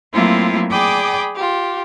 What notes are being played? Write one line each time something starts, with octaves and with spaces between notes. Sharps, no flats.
F#3 A3 A#3 C4 E4 F4
G#4 D5 G5 B5 D6 D#6
F4 G4